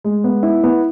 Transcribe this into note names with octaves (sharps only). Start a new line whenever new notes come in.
G#3
B3
E4
B3